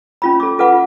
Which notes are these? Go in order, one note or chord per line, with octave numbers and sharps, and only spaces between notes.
C#4 F4 B5
A4 D6
F4 A4 B4 F#5 D6
F4